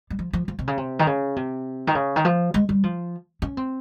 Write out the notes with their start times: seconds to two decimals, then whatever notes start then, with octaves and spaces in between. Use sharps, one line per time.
0.10 G3
0.19 F3
0.33 F3
0.48 F3
0.59 C3
0.68 C#3
0.77 C3
0.99 D#3
1.07 C#3
1.36 C3
1.87 D#3
1.95 C#3
2.16 D#3
2.25 F3
2.54 G#3
2.69 G3
2.83 F3
3.42 C#4
3.57 C4